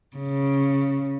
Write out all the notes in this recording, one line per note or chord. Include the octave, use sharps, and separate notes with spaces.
C#3